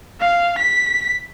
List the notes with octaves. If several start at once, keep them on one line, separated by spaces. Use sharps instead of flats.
F5
B6